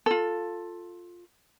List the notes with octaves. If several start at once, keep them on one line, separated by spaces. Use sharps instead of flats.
F4 A4